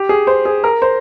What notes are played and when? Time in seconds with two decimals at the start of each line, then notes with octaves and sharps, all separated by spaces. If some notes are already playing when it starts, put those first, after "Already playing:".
Already playing: G4
0.09 G#4
0.27 C5
0.45 G#4
0.64 A#4
0.82 C5